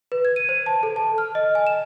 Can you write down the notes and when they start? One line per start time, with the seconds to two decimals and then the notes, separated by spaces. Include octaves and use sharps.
0.12 B4
0.25 G#6
0.36 D#7
0.49 C5
0.66 A5
0.83 A4
0.96 A5
1.18 F6
1.35 D#5
1.55 G#5
1.67 E7